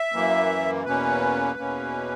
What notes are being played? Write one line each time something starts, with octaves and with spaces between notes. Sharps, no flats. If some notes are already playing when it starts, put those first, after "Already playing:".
Already playing: E5
F#2 E3 A#3
E2 B2 A#3 C#4 B4
E2 B2 A#3 C#4